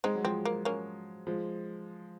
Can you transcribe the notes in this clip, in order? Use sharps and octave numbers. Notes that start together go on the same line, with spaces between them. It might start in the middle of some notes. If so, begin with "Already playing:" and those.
G#3 C4 D#4
F#3
F3 G#3 C4
A#3
A#3 C#4
F3 G#3